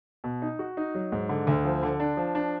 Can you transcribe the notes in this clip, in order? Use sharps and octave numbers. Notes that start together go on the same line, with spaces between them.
B2
D#4
F#4
D#4
F#3
G#2
D3
D2
F3
D3
D4
F3
D4